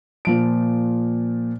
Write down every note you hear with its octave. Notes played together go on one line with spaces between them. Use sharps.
A#2 F3 D7